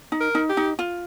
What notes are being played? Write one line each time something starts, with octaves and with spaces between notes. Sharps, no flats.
D#4
A#4
D#4
G4
D#4
F4